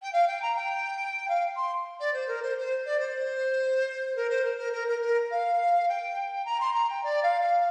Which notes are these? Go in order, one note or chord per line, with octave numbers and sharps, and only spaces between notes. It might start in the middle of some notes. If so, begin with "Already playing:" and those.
G5
F5
G5
A#5
G5
F5
C6
D5
C5
A#4
C5
C5
D5
C5
A#4
C5
A#4
A#4
A#4
A#4
A#4
F5
G5
A#5
C6
A#5
G5
D5
F5
F5